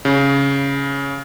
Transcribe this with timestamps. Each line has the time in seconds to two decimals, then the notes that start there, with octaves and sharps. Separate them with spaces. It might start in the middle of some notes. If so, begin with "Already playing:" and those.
0.05 C#3